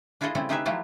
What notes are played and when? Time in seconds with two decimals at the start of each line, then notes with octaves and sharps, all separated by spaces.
0.21 D4 E4 F4 G#4 A4 D#5
0.35 C#3 G3 A3 C4 E4 A4
0.49 A3 D#4 G4 G#4 B4 E5
0.66 F3 F#3 A3 E4 F4 G4